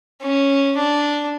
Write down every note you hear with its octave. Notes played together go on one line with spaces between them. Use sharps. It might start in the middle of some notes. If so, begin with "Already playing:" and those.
C#4
D4